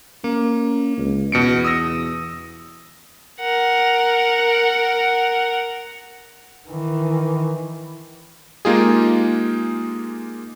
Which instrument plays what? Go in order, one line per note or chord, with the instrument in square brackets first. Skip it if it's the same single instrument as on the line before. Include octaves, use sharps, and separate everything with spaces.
[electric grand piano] A#3 [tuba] C#4
[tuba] C#2
[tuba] E2 [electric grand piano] B2 C#7 D7
[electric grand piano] D#6 E6 A#6
[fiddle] A#4 F#5
[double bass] D#3 E3
[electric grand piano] G#3 A#3 D#4 F4 G4 G#4